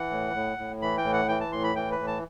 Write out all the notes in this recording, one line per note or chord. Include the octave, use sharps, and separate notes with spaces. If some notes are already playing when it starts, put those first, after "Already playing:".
Already playing: E3 F#5
A2
A2
A2
E3 B5
G5
A2
F#5
E3 G5
A5
A2 C6
B5
E3 G5
B4
A2
A5